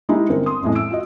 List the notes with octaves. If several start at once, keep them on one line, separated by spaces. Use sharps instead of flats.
G#3 D#4 E4 G4
G1 C4 A#4
C6 D#6
A1 F2 A2 G#3
E6 D7
F4 F#4 D#5